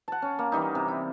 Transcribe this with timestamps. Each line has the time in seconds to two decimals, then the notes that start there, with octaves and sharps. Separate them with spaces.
0.08 F#5 A5
0.22 C#4
0.39 A#3
0.52 E3 G3 D#4
0.75 C3
0.88 E4